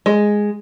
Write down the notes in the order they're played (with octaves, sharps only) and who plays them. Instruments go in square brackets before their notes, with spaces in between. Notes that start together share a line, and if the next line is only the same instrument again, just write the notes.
[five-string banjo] G#3